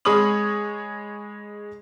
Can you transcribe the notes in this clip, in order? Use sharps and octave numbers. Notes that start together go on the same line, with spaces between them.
G#3 G#4 C#5 B5 D#6 F#7